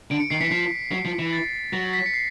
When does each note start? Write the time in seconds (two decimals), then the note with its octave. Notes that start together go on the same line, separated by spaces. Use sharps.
0.11 D3 D7
0.20 C#7
0.30 D#3 C7
0.40 E3 B6 C#7
0.51 F3 C7
0.92 F#3 C7
1.05 F3
1.19 E3
1.33 A6
1.73 F#3 A#6
1.93 B6
2.06 C#7
2.14 C7